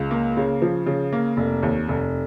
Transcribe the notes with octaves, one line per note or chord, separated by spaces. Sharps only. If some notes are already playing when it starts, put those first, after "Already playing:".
Already playing: C#2
A#3
C#3
F3
C#3
A#3
F1
D#2
F1